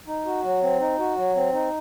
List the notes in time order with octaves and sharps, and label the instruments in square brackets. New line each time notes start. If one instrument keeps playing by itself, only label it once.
[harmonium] D#4
F#4
F#3
C4
D#4
F#4
F#3
C4
D#4